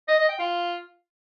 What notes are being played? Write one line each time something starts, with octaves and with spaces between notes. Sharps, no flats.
D#5
D#5
G5
F4